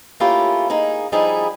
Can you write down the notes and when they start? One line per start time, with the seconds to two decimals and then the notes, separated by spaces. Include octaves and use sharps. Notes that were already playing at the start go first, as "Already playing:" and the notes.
0.20 A3 A#3 C#4 E4 F4 G4
0.70 A#3 D#4 G#4
1.12 F3 G3 D#4 E4 G#4